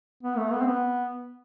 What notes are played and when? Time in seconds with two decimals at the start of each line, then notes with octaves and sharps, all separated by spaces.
0.23 B3
0.37 A3
0.52 B3
0.61 C4
0.67 B3